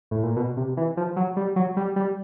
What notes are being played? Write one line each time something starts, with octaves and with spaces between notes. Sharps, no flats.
A2
A#2
B2
C3
E3
F3
F#3
G3
F#3
G3
G3